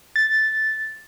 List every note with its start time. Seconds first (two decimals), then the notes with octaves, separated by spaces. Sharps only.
0.16 A6